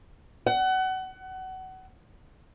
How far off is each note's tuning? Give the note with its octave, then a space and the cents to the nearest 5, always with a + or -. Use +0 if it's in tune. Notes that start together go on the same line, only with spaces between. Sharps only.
F#5 +25